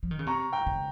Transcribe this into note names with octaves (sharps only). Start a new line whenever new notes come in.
F3
D#3
C#3
C3 A#5 C#6
G5 A#5
C#3